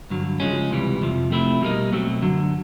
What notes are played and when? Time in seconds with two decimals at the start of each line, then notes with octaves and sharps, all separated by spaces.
0.10 G2 D3 F#3
0.40 C#3 F3 G#3 C#4
0.71 C#2 C3 E3 G3
1.01 F2 C3 F3
1.30 C3 F3 A3 C4 E4
1.61 B2 G3 A#3 D#4
1.92 B2 F#3 A3 C4
2.22 F#2 D3 F#3